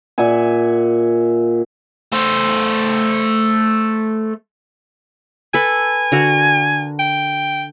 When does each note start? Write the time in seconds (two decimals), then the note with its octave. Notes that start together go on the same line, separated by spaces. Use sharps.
0.18 A#2 E5 F#5 G#5
2.12 A3 C5
5.54 A4 B4 G#5
6.12 D3 F#4 A#4
6.99 G5